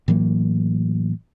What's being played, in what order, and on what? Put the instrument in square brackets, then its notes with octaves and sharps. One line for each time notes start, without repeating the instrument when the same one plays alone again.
[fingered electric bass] A2 E3 F#3 A#3